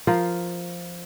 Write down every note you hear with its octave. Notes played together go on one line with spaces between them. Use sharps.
F3 F4 A#4